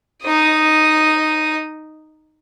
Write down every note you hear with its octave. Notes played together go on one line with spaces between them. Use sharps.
D#4 D#6